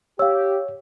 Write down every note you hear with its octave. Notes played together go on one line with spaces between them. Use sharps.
G4 C#5 F5 E6